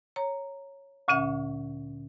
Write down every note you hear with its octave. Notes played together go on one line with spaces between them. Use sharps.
C#5 A#5
D2 A#2 D3 C#4 E5 F#5